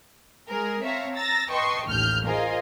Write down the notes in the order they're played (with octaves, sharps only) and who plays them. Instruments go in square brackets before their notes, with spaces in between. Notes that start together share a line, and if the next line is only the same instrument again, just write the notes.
[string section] G#3 G#4 A#4
C4 C#5 E5 F5 A5 A#5
A#5 E6 A6 A#6
B4 D#5 G5 A5 C6 C#6
A1 D#2 F6 G6
F4 G#4 A#4 C5 D#5 G#5